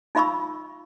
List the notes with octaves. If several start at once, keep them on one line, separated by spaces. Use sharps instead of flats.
D#4 F4 F5 B5 C#6 E6